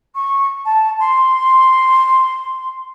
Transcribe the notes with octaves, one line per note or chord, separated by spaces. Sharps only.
C#6
A5
C6